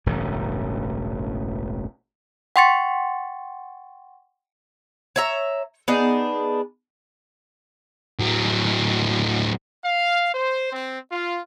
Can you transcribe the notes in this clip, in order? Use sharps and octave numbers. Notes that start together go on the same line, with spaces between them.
E1 A1 G2 C#3
F#5 G5 C6 C#6 A6 C#7
C#5 E5 A#5
B3 D4 D#4 G#4
A2 F#3
F5
C5
C4
F4